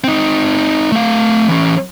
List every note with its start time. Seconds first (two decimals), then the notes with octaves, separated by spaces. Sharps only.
0.04 C4 D#4
0.92 A3 F5
1.48 E3 C#4